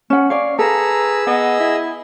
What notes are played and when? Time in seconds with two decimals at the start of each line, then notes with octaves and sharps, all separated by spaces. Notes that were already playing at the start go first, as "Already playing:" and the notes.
0.10 C#4 F#5
0.30 C#5 D5 F5
0.59 G#4 A4 B4 A#5 E6
1.27 B3 D#5 F#5
1.60 E4